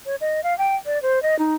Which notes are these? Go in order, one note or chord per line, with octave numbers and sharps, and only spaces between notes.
C#5
D#5
F5
G5
D5
C5
D#5
D#4